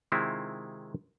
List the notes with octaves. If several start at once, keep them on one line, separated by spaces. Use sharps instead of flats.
C3 D#3 G#3 C4 E4 F4